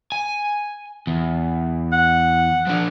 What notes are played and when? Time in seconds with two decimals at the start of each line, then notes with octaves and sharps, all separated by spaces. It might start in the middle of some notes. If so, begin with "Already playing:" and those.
0.12 G#5
1.07 E2
1.92 F#5
2.67 F3 D4